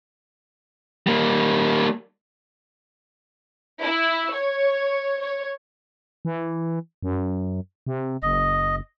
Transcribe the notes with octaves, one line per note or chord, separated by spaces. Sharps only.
G3 A#3
E4
C#5
C#5
E3
F#2
C3
F#1 D#5